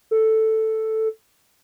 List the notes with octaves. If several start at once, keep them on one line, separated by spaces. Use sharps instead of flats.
A4